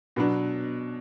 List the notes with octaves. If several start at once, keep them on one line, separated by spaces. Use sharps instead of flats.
B2 F#3 B3 D4